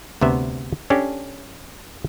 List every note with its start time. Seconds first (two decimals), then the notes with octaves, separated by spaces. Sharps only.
0.21 D2 C3 B3 E5
0.90 C#4 D4 G4 A4